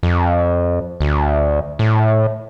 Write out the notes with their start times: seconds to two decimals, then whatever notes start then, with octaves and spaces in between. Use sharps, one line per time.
0.03 F2
1.01 D2
1.79 A2